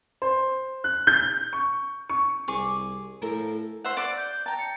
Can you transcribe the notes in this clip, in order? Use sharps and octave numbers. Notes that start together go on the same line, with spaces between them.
C5
F#6
G6
C#6
C#6
C2 G#4 C#6 D6
A2 F3 A4 A#4
C5 E5 F#5
D5 F#5 D6 D7
G6
G5 A5 A#5
C#7